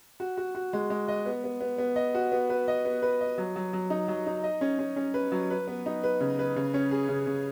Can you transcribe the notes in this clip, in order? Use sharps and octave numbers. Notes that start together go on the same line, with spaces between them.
F#4
F#4
F#4
G#3
G#3
D#5
B3
B3
B3
B3
D#5
F#4
B3
B4
D#5
B3
B4
D#5
F#3
F#3
F#3
D#4
F#3
D#4
D#5
C#4
C#4
C#4
B4
F#3
B4
B3
D#4
B4
C#3
B4
C#3
C#4
G#4
C#3
C#3